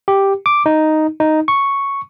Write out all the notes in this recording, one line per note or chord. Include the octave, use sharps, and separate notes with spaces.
G4
D6
D#4
D#4
C#6